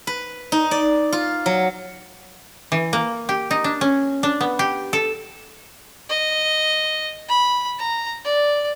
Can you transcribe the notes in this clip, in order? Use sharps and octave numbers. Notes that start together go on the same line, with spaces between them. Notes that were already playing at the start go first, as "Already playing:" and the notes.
B4
D#4
D5
F4
F#3
E3
A#3
G4
D#4
D4
C#4
D4
B3
G4
A4
D#5
B5
A#5
D5